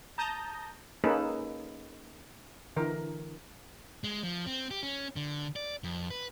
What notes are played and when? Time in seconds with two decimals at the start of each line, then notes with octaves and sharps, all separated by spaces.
0.18 A5 A#5 D#6 G6 A#6
1.04 A#3 C#4 D#4 G#4 A4 B4
2.76 D3 E3 A#4
4.04 G#3
4.23 F3
4.46 C4
4.71 G4
4.83 C#4
5.16 D3
5.56 D5
5.84 F2
6.10 B4